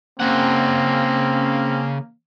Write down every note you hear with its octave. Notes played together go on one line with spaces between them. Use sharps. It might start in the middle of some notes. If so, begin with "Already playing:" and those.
C#3 A#3 C4 F#5